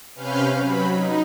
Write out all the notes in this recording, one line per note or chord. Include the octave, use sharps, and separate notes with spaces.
C3 C#4 B4 F5 F6 G6
F#3 B5
D#4